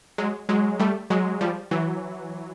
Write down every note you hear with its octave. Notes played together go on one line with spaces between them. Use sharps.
F#3 G#3
F#3 G#3
G3 A3
F#3 G#3
F3 G3
E3 F#3